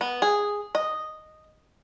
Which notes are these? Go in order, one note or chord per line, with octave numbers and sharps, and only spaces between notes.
B3
G#4
D#5